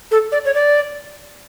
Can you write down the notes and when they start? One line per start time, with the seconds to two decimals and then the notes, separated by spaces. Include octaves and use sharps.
0.11 A4
0.32 D5
0.45 C#5
0.55 D5